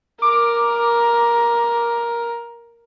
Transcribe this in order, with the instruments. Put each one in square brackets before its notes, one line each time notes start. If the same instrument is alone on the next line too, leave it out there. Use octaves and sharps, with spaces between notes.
[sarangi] A#4 [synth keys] D6